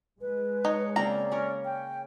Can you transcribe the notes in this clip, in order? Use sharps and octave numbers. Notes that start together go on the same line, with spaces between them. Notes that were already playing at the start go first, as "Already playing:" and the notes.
G#3 B4
D#4 C#5
C#3 A#3 C4 D5 A#5
C#4 A#4
G5